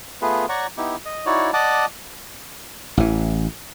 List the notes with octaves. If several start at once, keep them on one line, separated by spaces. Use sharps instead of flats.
A3 B3 F4 G#4 B4
C#5 D5 F#5 A#5 C#6
B3 D#4 E4 G4
D#5
D#4 E4 F#4 C#5 D5
D5 D#5 F#5 A5 D6
A1 E3